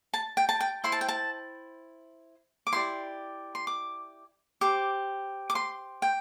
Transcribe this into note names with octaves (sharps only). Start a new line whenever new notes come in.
A5
G5
A5
G5
E4 C5 C6
A5
G5
A5
D6
E4 G4 D5 C6
C6
D6
G4 C5 D6
D6
C6
G5